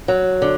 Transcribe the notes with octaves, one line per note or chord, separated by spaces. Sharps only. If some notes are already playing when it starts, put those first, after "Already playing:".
F#3
D3